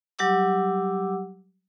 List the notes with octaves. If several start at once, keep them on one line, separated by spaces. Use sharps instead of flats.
F#3 G3 G4 F#5 D6 E6